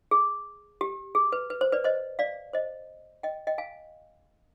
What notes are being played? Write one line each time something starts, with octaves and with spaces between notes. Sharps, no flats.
G#4
G4
G#4
B4
B4
C5
B4 D5
C5 D#5
D5 F5
C5 D#5
D#5 G5
D#5 G5
F5 G#5